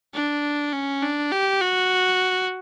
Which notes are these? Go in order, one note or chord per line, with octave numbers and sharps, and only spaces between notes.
D4
C#4
D4
G4
F#4